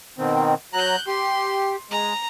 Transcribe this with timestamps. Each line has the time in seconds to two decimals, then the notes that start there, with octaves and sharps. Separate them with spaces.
0.18 B2 D#3 C4
0.73 F#3 A#5 F#6 G6
1.07 G4 C6
1.91 G#3 A#5